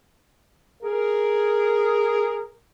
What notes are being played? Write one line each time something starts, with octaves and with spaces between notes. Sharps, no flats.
G#4 A#4